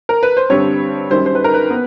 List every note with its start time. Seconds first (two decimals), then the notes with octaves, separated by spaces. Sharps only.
0.09 A#4
0.23 B4
0.37 C5
0.50 G2 D3 G3 C4 C#5
1.10 F#2 D#3 G3 C5
1.26 C5
1.35 B4
1.44 A#4
1.54 B4
1.70 B3